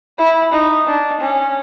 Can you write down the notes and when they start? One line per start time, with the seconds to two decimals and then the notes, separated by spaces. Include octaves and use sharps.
0.19 E4
0.53 D#4
0.87 D4
1.21 C#4